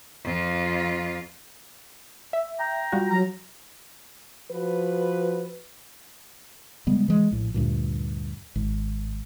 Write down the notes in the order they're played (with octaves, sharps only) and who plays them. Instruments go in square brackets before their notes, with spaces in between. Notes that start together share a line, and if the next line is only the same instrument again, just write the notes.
[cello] F2 F4
[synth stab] E5
[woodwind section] G5 A#5
[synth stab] G3 F4 F#4
[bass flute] F#3 [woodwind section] A#5
[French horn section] F3 F#4 B4
[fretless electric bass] C#3 G3 G#3 B3
E3 G#3
A#1 A2
D2 G2 A#2
G#1